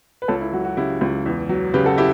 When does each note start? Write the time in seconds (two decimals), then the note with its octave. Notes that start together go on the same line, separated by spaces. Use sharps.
0.22 B4
0.28 C#2 A4 C#5
0.41 E4
0.53 F#3 F#4
0.65 F#4
0.77 C#3 E4 G4
1.01 C#2
1.26 E2
1.49 F#3
1.74 C#3 G4 B4
1.86 F#4 A4
1.98 E4 G4